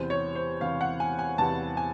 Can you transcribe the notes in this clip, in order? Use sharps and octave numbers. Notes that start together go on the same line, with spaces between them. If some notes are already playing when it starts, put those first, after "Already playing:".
Already playing: E2 C3 E3 C5
C#5
C5
E2 C3 E3 F5
F#5
G#5
G#5
E2 C3 E3 A5
G#5